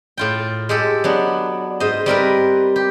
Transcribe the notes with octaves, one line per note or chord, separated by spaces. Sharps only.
A2 F4 G5
G#3 G4 A4
F#3 B3 D4
G#2 C5 D#5
G3 C4 A#4 B4
G4